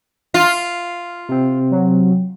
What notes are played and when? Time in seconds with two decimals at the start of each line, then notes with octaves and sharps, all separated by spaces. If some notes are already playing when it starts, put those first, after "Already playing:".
0.34 F4
1.29 C3 C4
1.71 F#3